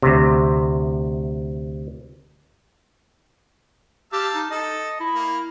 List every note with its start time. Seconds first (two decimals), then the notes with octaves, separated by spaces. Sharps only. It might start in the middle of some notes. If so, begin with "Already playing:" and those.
0.03 D2 C3
4.13 G4 F5 A5 E6
4.34 D#4
4.51 A4 D#5
5.00 E4
5.15 A#3